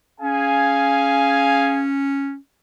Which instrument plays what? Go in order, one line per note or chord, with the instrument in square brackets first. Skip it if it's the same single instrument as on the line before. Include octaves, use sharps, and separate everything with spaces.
[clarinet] C#4 [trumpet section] G#4 F5 G#5